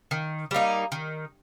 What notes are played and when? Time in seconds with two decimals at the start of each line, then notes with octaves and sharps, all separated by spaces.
0.11 D#3
0.51 G3 A#3 D#4
0.92 D#3